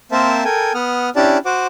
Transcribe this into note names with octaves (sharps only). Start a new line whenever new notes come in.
A#3 C4 A#4 C5 E5 A5
A4 A#4 G5 G#5
B3 F#5 D#6 F6
C#4 D4 E4 G4 D5 A5
F#4 C5 F#5 D6